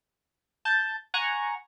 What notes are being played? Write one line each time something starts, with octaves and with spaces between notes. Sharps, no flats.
A5 G6
F#5 G#5 A#5 C#6